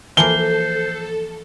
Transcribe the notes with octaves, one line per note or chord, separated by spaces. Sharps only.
E3 F3 A#3 A4 C5 G7